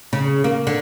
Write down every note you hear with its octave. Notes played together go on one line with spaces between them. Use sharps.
C#3
A#3
D3